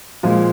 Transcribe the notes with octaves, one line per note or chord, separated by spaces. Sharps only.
A#2 F3 G#3